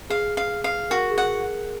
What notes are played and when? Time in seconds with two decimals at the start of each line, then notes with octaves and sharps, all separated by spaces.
0.10 G#4 F5
0.37 F5
0.64 F5
0.90 F#4 A#4
1.11 G#4
1.18 F#5